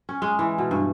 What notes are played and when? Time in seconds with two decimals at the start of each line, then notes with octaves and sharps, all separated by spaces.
0.09 C#4
0.22 G#3
0.39 E3
0.58 B2
0.71 G2